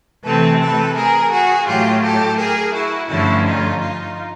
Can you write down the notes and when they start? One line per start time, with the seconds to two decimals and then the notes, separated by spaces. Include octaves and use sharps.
0.24 C3 E3 A3 C4 A4 B4
0.60 A4 B4
0.96 G#4 A#4
1.32 F#4 G#4
1.67 A2 F#3 A3 F4 G4
2.03 G4 A4
2.39 G#4 A#4
2.74 E4 F#4
3.09 G2 D3 F3 A3 C#4 E4 F#4
3.46 D#4 F4
3.81 D#4 F4